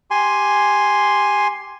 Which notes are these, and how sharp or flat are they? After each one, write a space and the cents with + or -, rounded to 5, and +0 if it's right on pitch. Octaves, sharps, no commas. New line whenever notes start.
G4 +0 G#5 +0 C6 +0